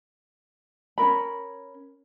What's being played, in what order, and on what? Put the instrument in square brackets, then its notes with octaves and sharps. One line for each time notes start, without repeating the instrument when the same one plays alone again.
[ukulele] C#4 D4 A#4 B5